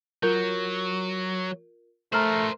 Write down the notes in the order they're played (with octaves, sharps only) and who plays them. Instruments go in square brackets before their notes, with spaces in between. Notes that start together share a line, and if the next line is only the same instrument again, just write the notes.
[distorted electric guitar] F#3 [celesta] F4 A#4 G6
[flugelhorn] A3 [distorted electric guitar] A#4 C5 [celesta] A#5 F6 F#7